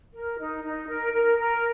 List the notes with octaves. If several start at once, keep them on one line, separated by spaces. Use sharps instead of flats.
A#4
D#4
D#4
A#4
A#4
A#4